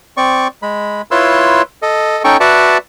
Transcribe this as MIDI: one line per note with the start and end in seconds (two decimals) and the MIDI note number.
0.17 0.48 60
0.17 0.48 74
0.17 0.48 85
0.62 1.02 56
0.62 1.02 83
1.11 1.62 64
1.11 1.62 65
1.11 1.62 71
1.11 1.62 73
1.11 1.62 84
1.11 1.62 88
1.82 2.23 69
1.82 2.23 75
2.24 2.37 61
2.24 2.37 63
2.24 2.37 69
2.24 2.37 79
2.24 2.37 85
2.40 2.78 66
2.40 2.78 71
2.40 2.78 74
2.40 2.78 76
2.40 2.78 78
2.40 2.78 81